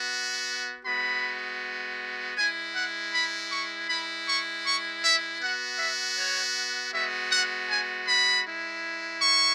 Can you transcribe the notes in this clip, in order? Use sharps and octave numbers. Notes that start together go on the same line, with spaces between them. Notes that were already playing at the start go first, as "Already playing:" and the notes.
Already playing: B3 F#4
G#3 B3 F#4 B5
G#3 E4 G#5
F#5
B5
C#6
G#3 E4 B5
C#6
C#6
E5
B3 F#4 F#5
E5
C#5
G#3 B3 F#4 E5
F#5
G#5
B5
G#3 E4
C#6